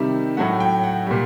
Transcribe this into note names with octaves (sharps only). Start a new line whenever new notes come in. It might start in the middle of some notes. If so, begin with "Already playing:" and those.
Already playing: C3 D#3 G3 E5
A2 F#3 A3 F#5
G5
F#5
A#2 G3